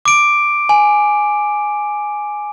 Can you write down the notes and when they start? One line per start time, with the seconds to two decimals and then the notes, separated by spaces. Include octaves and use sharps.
0.05 D6 D7
0.69 G#5